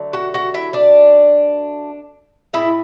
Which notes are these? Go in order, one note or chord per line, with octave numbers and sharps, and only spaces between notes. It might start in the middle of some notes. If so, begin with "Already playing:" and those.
Already playing: D3 F#3 A3
F#4 F#5
F#4 F#5
E4 E5
D4 D5
A2 G#3 E4 E5